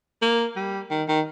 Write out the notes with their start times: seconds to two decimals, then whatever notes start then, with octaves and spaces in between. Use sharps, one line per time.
0.22 A#3
0.56 G3
0.91 D#3
1.08 D#3